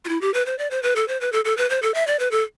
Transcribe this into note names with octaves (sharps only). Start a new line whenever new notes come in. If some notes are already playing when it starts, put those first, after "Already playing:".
F4
E4
G4
B4
C5
D5
C5
B4
A4
C5
B4
A4
A4
B4
C5
A4
E5
D5
B4
A4